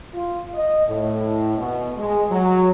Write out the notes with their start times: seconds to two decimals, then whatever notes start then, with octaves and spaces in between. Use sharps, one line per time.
0.14 F4
0.54 D#5
0.87 A2
1.58 B2
1.97 G#3
2.31 F#3